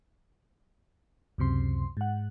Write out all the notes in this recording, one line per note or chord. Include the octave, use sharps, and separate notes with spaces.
C#2 F#2 C3 C6
G#2 F#5